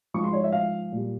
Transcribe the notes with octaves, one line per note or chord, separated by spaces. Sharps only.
G#2 F3 G#3 C#6
C6
C#5
E5
F5
A#2 G3